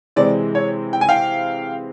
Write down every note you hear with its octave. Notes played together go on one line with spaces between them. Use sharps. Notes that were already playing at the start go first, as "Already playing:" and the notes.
C3 E3 G#3 C4 D5
C#5
G5
G#5
F5 G5